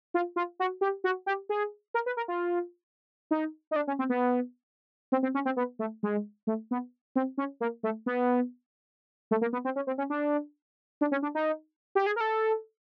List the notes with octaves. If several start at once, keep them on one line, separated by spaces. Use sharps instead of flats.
F4
F4
F#4
G4
F#4
G4
G#4
A#4
B4
A#4
F4
D#4
D#4
D4
C#4
C4
B3
C4
C4
C#4
C4
B3
A3
G#3
A3
B3
C4
C#4
A#3
A3
B3
A3
A#3
B3
C4
C#4
C4
C#4
D4
D4
C#4
D4
D#4
G4
G#4
A#4
A4